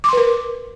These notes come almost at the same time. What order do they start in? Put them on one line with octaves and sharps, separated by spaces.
D6 C6 B4 A#4